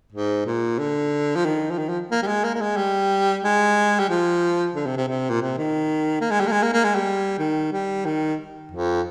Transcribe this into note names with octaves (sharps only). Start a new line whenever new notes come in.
G#2
A#2
D3
F3
D#3
F3
D#3
F3
A#3
G3
G#3
A#3
A#3
G#3
G3
G#3
G3
F3
D3
C3
C3
C3
A#2
C3
D#3
A#3
G#3
G3
A#3
G#3
A#3
A#3
G#3
G3
D#3
G3
D#3
F2